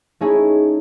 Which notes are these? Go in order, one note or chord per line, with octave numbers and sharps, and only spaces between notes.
A3 C#4 D#4 E4 G#4